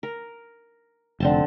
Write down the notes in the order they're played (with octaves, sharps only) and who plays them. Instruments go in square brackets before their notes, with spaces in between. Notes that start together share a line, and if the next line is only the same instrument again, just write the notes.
[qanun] A#4
[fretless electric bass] F1 [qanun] D3 C4 A5